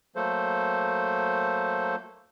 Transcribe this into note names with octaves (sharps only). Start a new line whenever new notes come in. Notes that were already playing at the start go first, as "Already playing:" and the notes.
F#3 A3 A#3 A4 C5